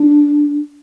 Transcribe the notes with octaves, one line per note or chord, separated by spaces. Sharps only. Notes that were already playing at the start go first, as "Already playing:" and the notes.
Already playing: D4